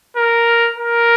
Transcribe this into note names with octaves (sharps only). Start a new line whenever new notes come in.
A#4
A#4